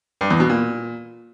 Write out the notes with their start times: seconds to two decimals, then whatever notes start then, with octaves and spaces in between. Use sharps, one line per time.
0.21 G2
0.30 E2
0.40 B2
0.50 A#2